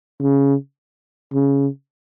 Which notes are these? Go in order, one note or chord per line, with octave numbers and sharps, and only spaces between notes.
C#3
C#3